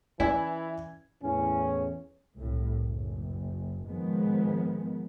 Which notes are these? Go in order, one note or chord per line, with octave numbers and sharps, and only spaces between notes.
E3 C#4 E4 D5 G#5 G#6
E2 A2 C#4
C2 A2
F#1
G#2 D#3 F3 G#3 B3